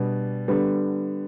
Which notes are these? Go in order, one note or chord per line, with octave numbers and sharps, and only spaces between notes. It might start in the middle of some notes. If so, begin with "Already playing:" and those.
Already playing: B2 G3 B3 D4
D3 G3 B3